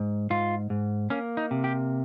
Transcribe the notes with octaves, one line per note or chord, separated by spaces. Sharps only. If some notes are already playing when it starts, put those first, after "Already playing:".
Already playing: G#2
G#2 F4
G#2
A#3 C#4
D#4
C3
G4